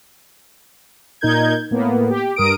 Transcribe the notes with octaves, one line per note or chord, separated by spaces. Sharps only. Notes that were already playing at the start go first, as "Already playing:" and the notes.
A#2 D#4 A#4 G6 G#6
A2 A#3 B3
G4
G2 A#4 D#6 D7